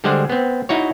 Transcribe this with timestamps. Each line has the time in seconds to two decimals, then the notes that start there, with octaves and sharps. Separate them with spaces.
0.04 D3 G3 G#3 C5 F#5
0.29 B3 C4
0.69 D#4 E4 F#4 C#5